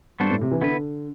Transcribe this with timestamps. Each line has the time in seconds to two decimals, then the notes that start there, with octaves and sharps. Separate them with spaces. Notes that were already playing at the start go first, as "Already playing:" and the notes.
0.20 G2 B3 D4 F#4 A4 C5
0.31 A2
0.41 C3
0.51 E3
0.62 D3 B3 E4 B4